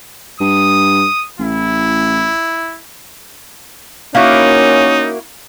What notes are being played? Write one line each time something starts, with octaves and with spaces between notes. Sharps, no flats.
G2 D#6
A1 E4
A#3 C#4 D#4 E4 F#4 F5